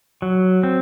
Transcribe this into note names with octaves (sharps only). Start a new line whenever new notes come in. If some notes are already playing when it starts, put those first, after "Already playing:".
F#3
C4